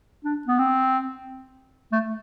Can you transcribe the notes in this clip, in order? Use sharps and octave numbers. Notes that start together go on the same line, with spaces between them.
D4
B3
C4
A3